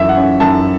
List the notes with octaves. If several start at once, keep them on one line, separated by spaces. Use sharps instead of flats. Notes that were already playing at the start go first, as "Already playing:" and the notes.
Already playing: F#2 E3 C#4 E5
F#5
C#4
F#2 A5